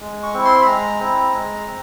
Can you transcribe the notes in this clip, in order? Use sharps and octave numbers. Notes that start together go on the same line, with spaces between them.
G#3
C#6
C4 E4
C6
B5
G#3 A#5
C4 E4
G#3
C4